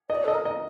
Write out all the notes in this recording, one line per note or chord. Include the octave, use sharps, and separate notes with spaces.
D5 D#5
A4 D#5
A#4
D#5